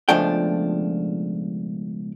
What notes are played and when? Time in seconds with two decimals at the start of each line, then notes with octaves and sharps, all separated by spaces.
0.09 C#2 B2 F3 A3 D4 G5